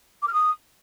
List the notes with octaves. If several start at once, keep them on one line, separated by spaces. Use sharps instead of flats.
D6
F6
D#6